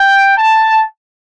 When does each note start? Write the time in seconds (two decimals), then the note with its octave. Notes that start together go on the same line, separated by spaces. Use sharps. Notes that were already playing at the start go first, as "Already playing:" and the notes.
Already playing: G5
0.37 A5